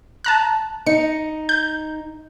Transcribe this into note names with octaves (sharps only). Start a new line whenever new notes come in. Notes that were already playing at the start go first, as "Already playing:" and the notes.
A5 A#5 F#6
D#4 C#7
G6